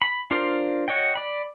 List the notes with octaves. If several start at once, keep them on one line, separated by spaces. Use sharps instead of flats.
B5
D4 F4 A#4 C5 D5
F#4 C#5 D#5 G5
D5 B5